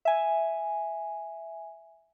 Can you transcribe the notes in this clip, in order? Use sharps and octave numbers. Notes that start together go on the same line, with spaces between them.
E5 G#5